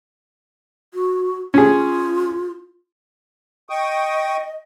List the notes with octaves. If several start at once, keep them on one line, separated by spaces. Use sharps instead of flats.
F#4
C#4 F4 G#4
D#5 G5 C#6 D#6